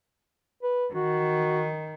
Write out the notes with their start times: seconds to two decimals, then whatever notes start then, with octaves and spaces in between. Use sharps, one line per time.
0.63 B4
0.94 D#3 F#4